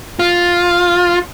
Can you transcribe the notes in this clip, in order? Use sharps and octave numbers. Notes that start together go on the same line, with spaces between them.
F4